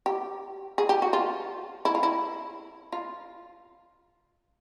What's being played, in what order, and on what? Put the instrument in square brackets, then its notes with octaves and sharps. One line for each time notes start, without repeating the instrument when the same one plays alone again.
[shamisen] G4
G#4
G4
F#4
F4
E4
F4
E4
F4